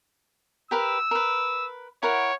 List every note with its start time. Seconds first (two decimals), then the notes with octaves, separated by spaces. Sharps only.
0.71 G4 A#4 B4 E6
1.11 A#4 B4
2.03 E4 A#4 C#5 F#5